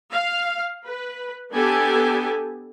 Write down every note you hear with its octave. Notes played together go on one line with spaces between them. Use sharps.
F5
B4
B3 D4 G4 A4 G#5